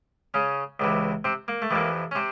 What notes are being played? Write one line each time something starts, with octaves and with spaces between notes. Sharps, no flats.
C#3 C#4
C#2 C3 E3
C3 C4
A#3
A3
F2 C3 E3 A#3
C#4
C3 C4